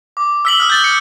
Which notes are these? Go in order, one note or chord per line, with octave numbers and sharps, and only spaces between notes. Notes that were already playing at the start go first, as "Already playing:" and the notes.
D6
E6 B6 F#7
D#6 F6 F#7 G7
G6 A6 G7
F6 B6 C#7